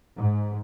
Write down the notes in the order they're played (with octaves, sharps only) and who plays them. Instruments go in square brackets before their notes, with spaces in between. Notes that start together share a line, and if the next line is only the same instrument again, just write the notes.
[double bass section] G#2